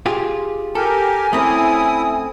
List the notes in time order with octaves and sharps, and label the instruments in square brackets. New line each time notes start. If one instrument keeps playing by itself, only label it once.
[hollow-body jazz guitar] F4 G4 G#4
[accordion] G4 A#4 [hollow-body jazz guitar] A4 [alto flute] G#5
[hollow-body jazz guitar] A3 C4 C#4 [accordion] E4 D#6